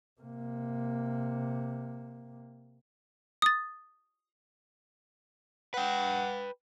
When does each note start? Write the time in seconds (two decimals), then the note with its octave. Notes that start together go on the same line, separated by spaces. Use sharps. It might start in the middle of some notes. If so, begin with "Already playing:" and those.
0.21 C3 A#3
3.42 D#6 A6
5.74 B4 F#5 G5